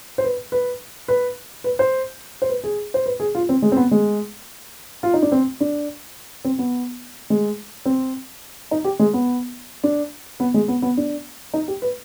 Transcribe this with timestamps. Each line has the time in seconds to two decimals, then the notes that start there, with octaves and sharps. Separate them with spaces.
0.18 C5
0.24 B4
0.52 B4
1.08 B4
1.64 B4
1.79 C5
2.42 C5
2.49 B4
2.64 G#4
2.94 C5
3.06 B4
3.20 G#4
3.35 F4
3.49 C4
3.62 G#3
3.72 C4
3.77 B3
3.91 G#3
5.03 F4
5.14 D#4
5.22 D4
5.32 C4
5.60 D4
6.45 C4
6.59 B3
7.30 G#3
7.86 C4
8.71 D#4
8.85 G4
8.99 G#3
9.14 B3
9.84 D4
10.40 B3
10.54 G#3
10.68 B3
10.82 B3
10.97 D4
11.54 D#4
11.68 G4
11.82 B4